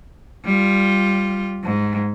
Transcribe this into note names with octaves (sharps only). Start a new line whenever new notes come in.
G3 F4
G#2